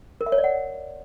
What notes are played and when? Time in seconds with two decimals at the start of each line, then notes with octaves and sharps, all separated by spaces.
0.21 A#4
0.26 E5
0.32 C#5
0.38 D5
0.44 F#5